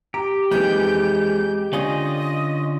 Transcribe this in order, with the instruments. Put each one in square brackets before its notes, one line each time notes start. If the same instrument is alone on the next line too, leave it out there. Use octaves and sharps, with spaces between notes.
[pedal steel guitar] G4 [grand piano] A#5
[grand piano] F2 E3 D#4 [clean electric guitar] G#3 [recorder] G6
[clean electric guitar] D3 C#4 F4 [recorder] D#5 [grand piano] G#5